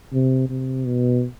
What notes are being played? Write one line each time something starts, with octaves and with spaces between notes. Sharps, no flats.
C3
C3
B2